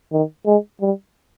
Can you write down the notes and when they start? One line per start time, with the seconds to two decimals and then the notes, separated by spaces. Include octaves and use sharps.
0.12 D#3
0.46 G#3
0.81 G3